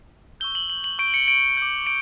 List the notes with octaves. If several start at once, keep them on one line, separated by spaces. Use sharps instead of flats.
C#6 E6 G6 G7
F#7
F#7
F#7
C#6 G6 D7
C#7
D7
D6 G6
D7